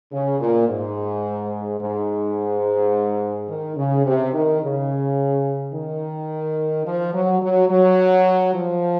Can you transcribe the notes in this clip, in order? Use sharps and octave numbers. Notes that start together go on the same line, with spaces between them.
C#3
A#2
G#2
G#2
D#3
C#3
C3
D#3
C#3
D#3
F3
F#3
F#3
F#3
F3